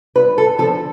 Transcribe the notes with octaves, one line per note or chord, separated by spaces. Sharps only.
G2 B4
A4
D3 F3 A4